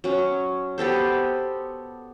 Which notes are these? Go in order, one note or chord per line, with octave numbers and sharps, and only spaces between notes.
F#3 C#4
B3 G4 A4 C5